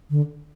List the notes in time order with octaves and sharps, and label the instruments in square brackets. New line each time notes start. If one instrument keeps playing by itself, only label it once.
[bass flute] D3